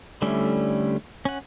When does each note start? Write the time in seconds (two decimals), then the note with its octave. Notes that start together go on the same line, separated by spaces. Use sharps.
0.22 D3 G3 A3 C#4 E4
1.25 C#4 F#5